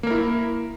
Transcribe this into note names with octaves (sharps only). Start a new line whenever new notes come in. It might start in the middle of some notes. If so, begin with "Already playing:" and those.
A#3 E4 A#4